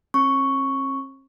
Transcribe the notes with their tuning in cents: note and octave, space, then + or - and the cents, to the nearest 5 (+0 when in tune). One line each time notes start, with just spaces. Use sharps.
C4 +45 C#6 +0